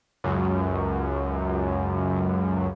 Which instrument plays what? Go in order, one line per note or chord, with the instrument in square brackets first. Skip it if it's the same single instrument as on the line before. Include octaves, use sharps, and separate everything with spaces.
[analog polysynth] C#2 F#2